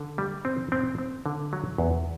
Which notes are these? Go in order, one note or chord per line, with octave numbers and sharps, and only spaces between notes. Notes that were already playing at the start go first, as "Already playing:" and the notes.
Already playing: D3
G3
C4
C4
C4
D3
F#3
E2